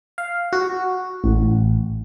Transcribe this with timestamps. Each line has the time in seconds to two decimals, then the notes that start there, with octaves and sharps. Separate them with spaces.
0.18 F5
0.53 F#4
1.24 A1